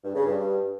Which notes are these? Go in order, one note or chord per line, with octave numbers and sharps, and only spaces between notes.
G2
C#3
G2